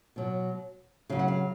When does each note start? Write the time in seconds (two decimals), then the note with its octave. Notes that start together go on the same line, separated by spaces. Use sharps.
0.16 B2 F#3
1.10 C#3 F#3 F5
1.19 F#5
1.28 F5